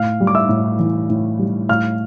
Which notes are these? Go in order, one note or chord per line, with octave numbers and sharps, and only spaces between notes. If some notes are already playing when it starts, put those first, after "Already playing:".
Already playing: A2 F5 F6
G3
D6
E5 E6
A2
E3
A2
G3
A2 F5 F6